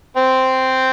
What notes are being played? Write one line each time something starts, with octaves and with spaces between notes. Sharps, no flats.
C4 C5